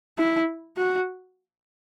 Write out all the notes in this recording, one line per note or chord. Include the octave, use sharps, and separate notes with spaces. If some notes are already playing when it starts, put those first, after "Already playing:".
E4
F#4